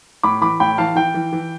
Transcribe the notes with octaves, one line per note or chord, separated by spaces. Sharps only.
A2 B5 D6
E3 B5 D6
A2 G5 B5
E3 F5 A5
E3 G5
E3
E3